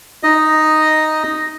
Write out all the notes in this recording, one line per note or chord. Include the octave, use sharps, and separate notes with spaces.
D#4 D#5